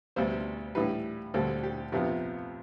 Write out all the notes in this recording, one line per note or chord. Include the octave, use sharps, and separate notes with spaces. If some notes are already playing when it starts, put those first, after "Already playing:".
D2 C3 G3 B3 C5
A2 E3 G3 B4
D2 D3 G3 C4 A4
G4
F2 C3 F3 B3 G4